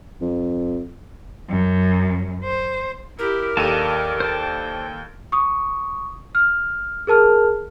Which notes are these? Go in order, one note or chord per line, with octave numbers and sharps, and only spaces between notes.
F2
F#2
C5
E4 G4 A#4
D#2 G4 A4 D5 D#5 F5 A5 D#7
C5 D5 G5 A5
C#6 D#6
F6
G#4 A#4 A5 F6